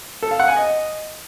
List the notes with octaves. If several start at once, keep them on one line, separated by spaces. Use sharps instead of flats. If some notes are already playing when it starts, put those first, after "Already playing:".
A4
F5
F#5
G#5
D#5